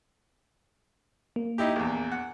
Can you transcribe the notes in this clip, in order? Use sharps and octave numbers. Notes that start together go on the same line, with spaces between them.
A#3
D#4 E4 G4
A#1 E2
F#5